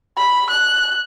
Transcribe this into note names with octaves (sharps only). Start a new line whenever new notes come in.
B5
F#6